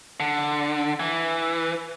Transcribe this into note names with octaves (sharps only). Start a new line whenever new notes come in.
D3
E3